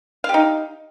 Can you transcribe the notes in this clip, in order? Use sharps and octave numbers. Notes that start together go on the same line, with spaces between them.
D#4 G4 F5